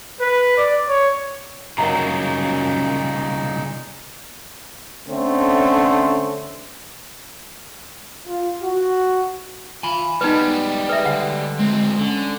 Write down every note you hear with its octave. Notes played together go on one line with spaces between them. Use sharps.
B4
D5
C#5
C2 F#2 A#2 C#3 D#4 A#4 F#5 A#5
D3 A3 C4 C#4
F4
F#4
F4 G#5 B5
G3 G#3 B3 D#4 B4
G#4 B4 E5
D3 F#5
D2 G#3 C4
D3 C#4